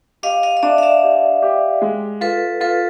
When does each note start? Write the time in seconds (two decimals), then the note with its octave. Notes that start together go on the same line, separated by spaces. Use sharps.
0.23 G4 D#5 F5
0.43 D#5 F5
0.57 D#5
0.63 D4 D5 E5
0.78 F5
0.83 D5 E5
1.03 G4
1.42 G4
1.82 G#3
2.21 F4 A4 B4
2.60 F4 A4 B4